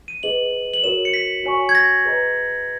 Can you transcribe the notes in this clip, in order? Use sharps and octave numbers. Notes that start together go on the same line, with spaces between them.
D#7
G#4 B4 D#5 F#7
F#7
F#4 A#4 C#5 E7
C#7
B6
F#4 C#5 G#5 C#6
G#6
A#6
G#4 B4 D#5 A#5